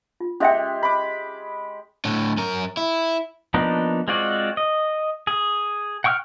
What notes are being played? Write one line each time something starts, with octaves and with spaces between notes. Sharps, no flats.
F4
G#3 C#4 G4 E5 G5
B5 D6
A2 D3
F#2 A#4
E4
F3 A#3 B3 D4 D#4
G#3 C4 F4 F#4 D5
D#5
G#4
F#5 G5 C#6 D#6 F6